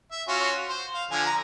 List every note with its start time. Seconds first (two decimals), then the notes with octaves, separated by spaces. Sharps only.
0.12 E5
0.28 C#4 F4 F#4
0.68 C5
0.94 F5
1.11 D3 F3 G#5
1.26 A#5